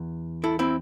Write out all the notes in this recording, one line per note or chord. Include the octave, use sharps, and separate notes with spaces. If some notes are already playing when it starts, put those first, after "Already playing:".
Already playing: E2
E4 A4
C4 E4